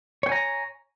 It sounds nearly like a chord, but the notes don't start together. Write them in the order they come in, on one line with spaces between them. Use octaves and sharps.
C#5 G5 G#5 A#5